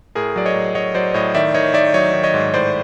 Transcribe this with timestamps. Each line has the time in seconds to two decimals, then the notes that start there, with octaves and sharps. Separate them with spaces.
0.15 A2 G#4 A#4
0.36 F#3 D5
0.46 C#5 D#5
0.55 A2
0.75 F#3 C#5 D#5
0.95 F#3 C5 D5
1.14 A2 C#5 D#5
1.35 D#3 D5 E5
1.54 D#3 C#5 D#5
1.74 D#3 D5 E5
1.94 F#3 C#5 D#5
2.13 D#3
2.23 C#5 D#5
2.34 G#2
2.54 A2 C5 D5